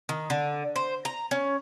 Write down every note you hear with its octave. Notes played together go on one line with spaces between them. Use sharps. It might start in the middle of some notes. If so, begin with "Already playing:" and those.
D#3
D3
C5
A#5
C#4